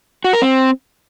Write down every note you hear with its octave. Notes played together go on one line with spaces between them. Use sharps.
F#4
A#4
C4